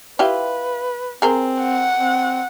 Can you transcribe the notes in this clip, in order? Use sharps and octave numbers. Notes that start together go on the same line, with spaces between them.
E4 F4 G4 B4
C4 G#4 A#4 C5
F#5
C4